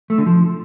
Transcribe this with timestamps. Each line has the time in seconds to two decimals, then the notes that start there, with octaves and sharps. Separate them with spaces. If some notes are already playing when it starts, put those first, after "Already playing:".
0.10 A3
0.18 D3
0.26 F3